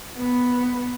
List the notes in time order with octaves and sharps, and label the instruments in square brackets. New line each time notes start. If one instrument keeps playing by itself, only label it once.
[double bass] B3